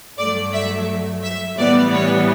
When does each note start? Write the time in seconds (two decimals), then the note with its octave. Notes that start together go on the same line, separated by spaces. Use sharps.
0.18 G2 F#3 A3 D5
0.53 E5
1.23 E5
1.58 A2 E3 G3 B3 D5
1.93 C#5